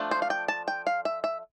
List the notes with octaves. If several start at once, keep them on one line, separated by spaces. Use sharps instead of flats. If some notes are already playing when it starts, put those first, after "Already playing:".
Already playing: F3 A3 D4
C5
F5
G5
A5
G5
F5
E5
E5